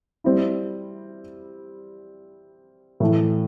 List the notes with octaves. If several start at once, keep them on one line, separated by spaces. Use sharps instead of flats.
G3 C4 E4
A2 E3 A3